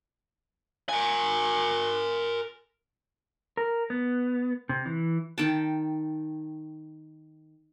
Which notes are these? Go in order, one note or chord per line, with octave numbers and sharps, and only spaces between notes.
A#4 G#5
A#4
B3
C3
E3
D#3 G5 A5